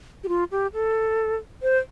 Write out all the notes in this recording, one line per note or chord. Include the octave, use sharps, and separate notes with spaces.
G4
F4
G4
A4
C5